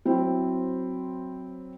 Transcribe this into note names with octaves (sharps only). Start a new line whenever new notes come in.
F#3 C4 E4 C5